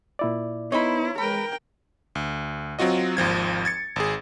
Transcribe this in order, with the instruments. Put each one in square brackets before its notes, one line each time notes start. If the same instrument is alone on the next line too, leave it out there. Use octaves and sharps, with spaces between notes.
[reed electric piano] A#2 E4 D5
[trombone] B3 [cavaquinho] D#4 C5 B5 [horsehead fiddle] E4 [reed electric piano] C#5
[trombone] G#3 [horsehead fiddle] A#4 G5 [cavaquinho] B4 B5
[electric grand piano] D2
F#3 C4 F4 F#4 D#5
G#1 D#2 F3 G#6
G#6 A6 C#7
G#1 G#4